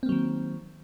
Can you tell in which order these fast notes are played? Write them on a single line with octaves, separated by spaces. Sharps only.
C4 A#3 F#3 D#3